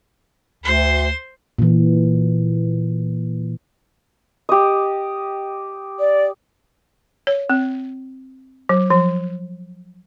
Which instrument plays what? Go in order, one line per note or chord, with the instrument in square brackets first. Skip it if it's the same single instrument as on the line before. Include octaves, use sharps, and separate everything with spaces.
[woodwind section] D2 [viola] C5 C6
[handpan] A#2 E3
[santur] G4 D#5
[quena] D5
[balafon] C#5
C4
F#3
F3